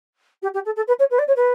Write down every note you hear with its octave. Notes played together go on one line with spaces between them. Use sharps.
G4
G4
A4
A4
B4
C#5
B4
D5
C#5
B4